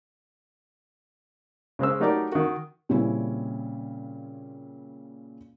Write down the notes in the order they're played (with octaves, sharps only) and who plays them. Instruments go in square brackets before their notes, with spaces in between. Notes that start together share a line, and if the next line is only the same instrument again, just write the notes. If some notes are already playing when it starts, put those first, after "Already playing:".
[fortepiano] C#3 G#3 C5 E6
F#3 A3 D#4 G4 A#4 D5
D#3 F#4
[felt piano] A#2 C#3 G3 C4 C#4 E4